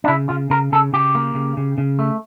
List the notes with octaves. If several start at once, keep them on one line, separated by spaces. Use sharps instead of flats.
D4
C#3 E4
C#3 F4
C#3 A#4
C#3 A4
C#3 G4
A#3
C#3
C#3
C#3
A3